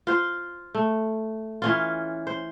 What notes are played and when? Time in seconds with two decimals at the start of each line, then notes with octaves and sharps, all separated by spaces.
0.07 F4 C5
0.74 A3
1.62 E3 C#4 F4
2.27 C5